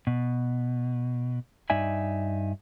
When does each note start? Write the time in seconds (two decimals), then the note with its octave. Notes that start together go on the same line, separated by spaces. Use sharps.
0.07 B2
1.70 G2 D#4 D5 E5 G#5